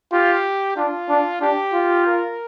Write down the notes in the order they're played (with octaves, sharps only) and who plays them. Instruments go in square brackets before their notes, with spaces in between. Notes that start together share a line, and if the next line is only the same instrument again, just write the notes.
[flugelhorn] F4 [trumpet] G4
[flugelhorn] D4 [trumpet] F4
[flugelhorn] D4
[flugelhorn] D4 [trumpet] G4
[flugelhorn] F4
[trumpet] A#4